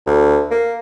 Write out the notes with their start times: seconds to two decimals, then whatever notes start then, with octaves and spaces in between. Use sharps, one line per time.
0.06 D2
0.50 A#3